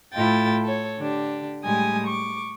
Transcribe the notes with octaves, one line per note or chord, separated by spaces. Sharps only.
A2 E4 F4 A4 G5 A6
A4 C#5
D3 D4 G4
A2 G3 G#3 G4 G#5 D#6
C#6 D6